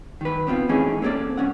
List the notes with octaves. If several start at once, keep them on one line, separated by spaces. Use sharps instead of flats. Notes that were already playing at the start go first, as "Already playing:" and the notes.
D#3 B4
B3 C4 D4 F4
E3 A3 C#4 D#4 G#4
A#3 C4 C#4 G4 A4 D5
C2 C#4 F#5